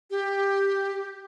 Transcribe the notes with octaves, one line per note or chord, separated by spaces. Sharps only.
G4